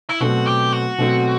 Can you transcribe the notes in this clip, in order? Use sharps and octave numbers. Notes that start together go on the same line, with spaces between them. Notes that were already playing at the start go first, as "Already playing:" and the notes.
E4
B2 F#3 A3 C4 F#4
G4
F#4
B2 F#3 A3 C4